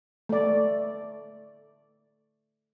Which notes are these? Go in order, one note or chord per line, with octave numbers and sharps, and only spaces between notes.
A3 D5